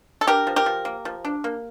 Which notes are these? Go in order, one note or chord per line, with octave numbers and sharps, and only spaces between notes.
A4
D4 G4 A#4
F3
G4 A#4
F3
A#3
F3
D4
A#3